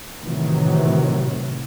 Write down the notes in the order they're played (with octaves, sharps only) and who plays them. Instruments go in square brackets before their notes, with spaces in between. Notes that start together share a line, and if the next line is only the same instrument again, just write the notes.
[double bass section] A2 C3 D#3 E3 F#3